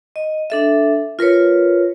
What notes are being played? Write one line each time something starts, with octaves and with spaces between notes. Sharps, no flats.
D#5
D4 A4 E5
F4 A#4 B4 C#5